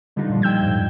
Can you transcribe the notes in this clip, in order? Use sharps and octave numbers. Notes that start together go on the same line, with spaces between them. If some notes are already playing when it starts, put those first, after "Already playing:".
G2 D3 G3 D4 D#4 F4
A#2 F3
G5 E6 G6 G#6
F2 G#2